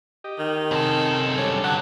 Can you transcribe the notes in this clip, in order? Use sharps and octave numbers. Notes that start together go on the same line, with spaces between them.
G4 D#5
D#3
F#2 C3 C4 G#4 A4
G3 D4 C#5
G2 D3 F#5